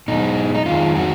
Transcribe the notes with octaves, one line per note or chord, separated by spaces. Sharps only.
B2 G#3 D#4
D#4
F2 D#3 G#3 F4
F#4